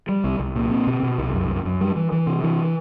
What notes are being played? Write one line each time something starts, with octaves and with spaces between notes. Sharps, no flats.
G3
C2
C2
A#2
C4
B2
B2
C2
F#2
F#2
F#2
G3
E3
E3
C3
E3